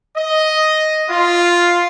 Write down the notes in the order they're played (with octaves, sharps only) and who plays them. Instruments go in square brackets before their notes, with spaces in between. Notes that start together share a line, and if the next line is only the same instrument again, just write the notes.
[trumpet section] D#5
F4